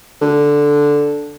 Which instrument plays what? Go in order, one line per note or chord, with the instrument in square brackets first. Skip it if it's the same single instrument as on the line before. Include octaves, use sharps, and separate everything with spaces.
[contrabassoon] D3